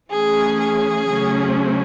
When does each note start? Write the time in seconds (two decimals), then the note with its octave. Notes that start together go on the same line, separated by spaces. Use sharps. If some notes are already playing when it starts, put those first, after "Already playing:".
0.11 E3 A3 C#4 G#4
0.59 G#4
1.08 C#3 F#3 A3 C#4